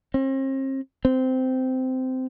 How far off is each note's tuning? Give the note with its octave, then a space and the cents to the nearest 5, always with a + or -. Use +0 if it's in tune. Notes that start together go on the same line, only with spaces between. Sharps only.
C4 +40
C4 -15